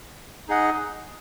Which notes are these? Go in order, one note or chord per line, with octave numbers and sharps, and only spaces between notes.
D#4 G#4 D#5 F#5